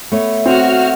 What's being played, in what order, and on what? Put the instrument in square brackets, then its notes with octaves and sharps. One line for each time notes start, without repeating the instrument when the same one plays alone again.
[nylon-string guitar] A3 B3 C#5
[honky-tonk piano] C4 [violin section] F#4 F6